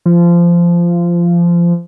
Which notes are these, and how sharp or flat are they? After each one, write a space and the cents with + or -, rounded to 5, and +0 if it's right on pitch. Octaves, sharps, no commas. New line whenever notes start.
F3 -20